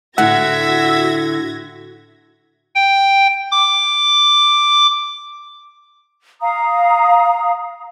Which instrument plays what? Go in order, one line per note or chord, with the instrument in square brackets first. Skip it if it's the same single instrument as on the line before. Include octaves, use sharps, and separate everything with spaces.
[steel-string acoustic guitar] A2 D3 [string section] F#4 G#6 A#6 [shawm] E5 [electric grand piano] F#5
[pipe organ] G5
D6
[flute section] F5 A#5 D#6